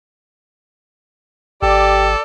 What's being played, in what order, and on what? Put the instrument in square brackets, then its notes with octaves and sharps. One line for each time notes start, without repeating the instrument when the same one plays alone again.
[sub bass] G#1 [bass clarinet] G4 [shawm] A4 [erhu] D5